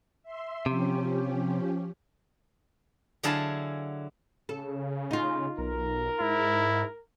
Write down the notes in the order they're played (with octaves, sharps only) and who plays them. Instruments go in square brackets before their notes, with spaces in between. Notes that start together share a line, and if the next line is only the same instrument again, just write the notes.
[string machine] E5 C6
[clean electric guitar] C3 [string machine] F3 C#4 G4
[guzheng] D3 F#3 E4 G#4 F5 A5
[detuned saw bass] C#3 [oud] A4
[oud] D#4 F4
[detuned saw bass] B1 [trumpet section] A#4
[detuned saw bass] G#2 [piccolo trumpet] E4